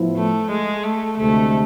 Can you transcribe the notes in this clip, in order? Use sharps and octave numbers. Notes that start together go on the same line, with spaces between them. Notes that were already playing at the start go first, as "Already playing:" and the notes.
Already playing: A2 F3 B3 E4
A3
G#3
A3
D2 C3 G#3 A3